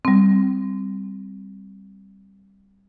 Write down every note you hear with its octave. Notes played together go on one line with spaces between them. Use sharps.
G3 C4